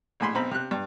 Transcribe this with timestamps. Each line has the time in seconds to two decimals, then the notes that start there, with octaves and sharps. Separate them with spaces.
0.20 A#1 A2 G#5 B5 C6
0.35 B1 C4 A#5 B5
0.51 C3 F#6
0.71 G2